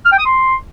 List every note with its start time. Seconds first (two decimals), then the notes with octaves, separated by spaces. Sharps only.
0.05 F6
0.12 G5
0.19 D#6
0.25 C6